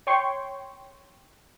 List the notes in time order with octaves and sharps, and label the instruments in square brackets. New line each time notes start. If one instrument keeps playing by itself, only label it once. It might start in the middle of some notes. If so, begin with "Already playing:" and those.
[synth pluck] C#5 G5 C6 C#6